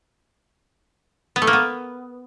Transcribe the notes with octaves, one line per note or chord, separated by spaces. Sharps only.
B3
A3
A#3
B3